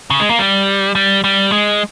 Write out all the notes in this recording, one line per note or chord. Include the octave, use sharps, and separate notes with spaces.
C#3
G#3
A#3
G3
G3
G3
G#3